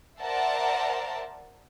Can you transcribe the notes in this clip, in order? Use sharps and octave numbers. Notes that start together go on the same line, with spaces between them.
A#4 C5 D5 E5 F#5 A5